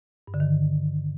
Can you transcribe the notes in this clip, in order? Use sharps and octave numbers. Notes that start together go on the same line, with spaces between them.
G2
D3
D#3